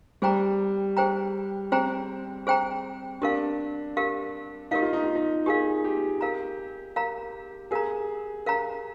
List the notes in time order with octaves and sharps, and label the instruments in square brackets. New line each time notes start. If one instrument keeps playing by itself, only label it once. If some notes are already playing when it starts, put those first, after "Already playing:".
[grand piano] G3 [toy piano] G#4 C5 G5 A#5
[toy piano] G#4 C5 G5 A#5
[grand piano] C4 [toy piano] G#4 C5 G5 A#5
[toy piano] G#4 C5 G5 A#5
[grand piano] D4 [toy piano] G4 A#4 F5
[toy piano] G4 A#4 F5
[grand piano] D#4 [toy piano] G4 A#4 F5
[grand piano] F4
D#4
F4
D#4
[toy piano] G4 A#4 F5 [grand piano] G#4
[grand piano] G4
[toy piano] A#4 F5 A#5
A#4 F5 A#5
[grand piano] G#4 [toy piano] A#4 F5 A#5
[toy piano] A#4 F5 A#5